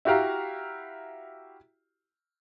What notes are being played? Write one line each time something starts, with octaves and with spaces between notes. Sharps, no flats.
E4 F#4 G4 F5 A#5